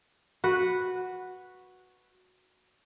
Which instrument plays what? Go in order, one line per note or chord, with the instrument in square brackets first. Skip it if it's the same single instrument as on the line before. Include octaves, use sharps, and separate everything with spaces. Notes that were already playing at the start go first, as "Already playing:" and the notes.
[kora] F#4 B4